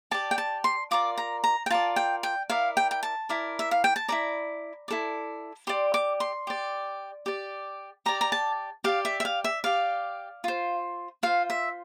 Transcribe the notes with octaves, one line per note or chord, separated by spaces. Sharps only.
G4 D5 A5
G5
A5
C6
F4 A#4 D5 D6
A#5
A#5
G5
F4 A#4 D5 A5
G5
G5
E4 A#4 D5 F5
G5
G5
A5
E4 A#4 D5
E5
F5
G5
A5
E4 A4 D5 A#5
E4 A4 D5
G4 D5 C6
D6
C6
G4 D5
G4 D5
G4 D5 A#5
A#5
A5
G4 D5 F5
E5
E5
F5
E5
G4 D5 F5
F4 C5
F4 C5 F5
E5